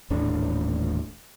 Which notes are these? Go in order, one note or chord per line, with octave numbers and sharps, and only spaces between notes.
D#1 A1 A2 D4